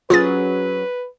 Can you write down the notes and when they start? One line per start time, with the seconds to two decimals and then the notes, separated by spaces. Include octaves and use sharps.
0.10 F#3 C#4 F4 G#4 B4 A6